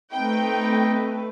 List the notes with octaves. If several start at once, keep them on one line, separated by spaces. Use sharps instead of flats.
A3 C4 D#4 B4 G5